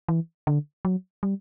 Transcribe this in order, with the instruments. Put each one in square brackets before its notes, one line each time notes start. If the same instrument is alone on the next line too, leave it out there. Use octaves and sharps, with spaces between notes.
[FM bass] E3
D3
F#3
G3